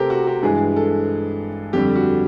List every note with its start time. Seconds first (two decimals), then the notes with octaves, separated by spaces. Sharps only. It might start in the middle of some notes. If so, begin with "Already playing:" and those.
Already playing: C3 A3 G4 A4 A#4 C5
0.10 F#4
0.27 G4
0.43 G2 E3 G#3 G#4
0.76 A4
1.73 F2 D3 G3 G4
1.96 F#4